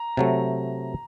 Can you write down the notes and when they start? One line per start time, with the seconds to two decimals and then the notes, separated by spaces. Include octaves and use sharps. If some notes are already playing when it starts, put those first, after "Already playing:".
Already playing: A#5
0.17 C3 F#3 A3